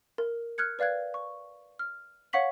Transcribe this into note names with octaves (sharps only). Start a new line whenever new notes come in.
A#4
F6 F#6 G#6 C#7
B4 D5 F5 F#6 G#6
C#6
F6
C#5 F5 F#5 C#6 B6 F#7